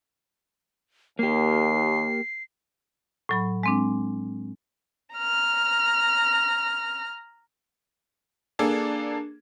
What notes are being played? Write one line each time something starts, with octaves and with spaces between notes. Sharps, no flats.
D#2 A#3 G4 C7
A2 F#3 B5
G#3 C4 D4
A#5 F6
A#3 D4 G#4 A4